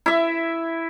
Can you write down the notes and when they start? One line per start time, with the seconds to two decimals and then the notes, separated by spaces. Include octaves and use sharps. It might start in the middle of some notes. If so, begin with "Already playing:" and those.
0.06 E4 E5